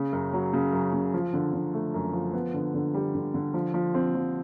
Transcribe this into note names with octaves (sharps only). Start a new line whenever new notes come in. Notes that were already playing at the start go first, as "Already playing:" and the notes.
Already playing: C#3
F#2
F#3
C#3
F#2
C#3
F3
D3
D3
A3
F#2
F3
B3
D3
D3
G3
D3
D3
F3
F3
C4
F3